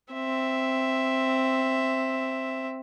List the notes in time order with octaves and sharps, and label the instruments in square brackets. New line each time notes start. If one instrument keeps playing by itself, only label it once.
[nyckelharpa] C4 E5